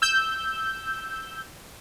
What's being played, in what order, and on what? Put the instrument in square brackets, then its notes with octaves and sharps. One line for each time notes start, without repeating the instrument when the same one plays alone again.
[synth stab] E6 G6